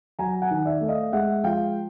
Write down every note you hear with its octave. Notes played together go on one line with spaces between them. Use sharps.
F#3 G#5 A#5
F#5 G#5
D#3
D5 E5
A3
D#5 F5
G#3 E5 F#5
F3 F5 G5